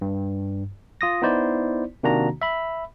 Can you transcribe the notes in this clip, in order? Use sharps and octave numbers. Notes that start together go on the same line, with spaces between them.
G2
F4 D#6 A#6
B3 D#4 E4 C5 D5
C3 D#3 A#3 D4 F#4 A#5
E5 B5